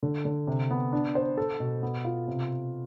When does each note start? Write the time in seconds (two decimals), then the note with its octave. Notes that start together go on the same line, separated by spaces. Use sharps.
0.03 D3
0.25 D3
0.47 C3
0.71 B3
0.92 D4
1.15 C5
1.37 A4
1.60 B2
1.83 B3
2.05 F4
2.28 C3